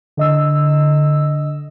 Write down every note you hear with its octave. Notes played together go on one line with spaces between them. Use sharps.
D3 D#5 E6